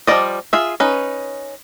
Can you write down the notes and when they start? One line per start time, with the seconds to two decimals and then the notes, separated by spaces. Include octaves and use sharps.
0.07 F3 G3 A#3 D5 D#5
0.53 F4 G#4 E5
0.80 C#4 D#4 B4